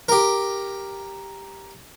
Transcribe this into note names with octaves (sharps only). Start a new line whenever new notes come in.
G4 A#4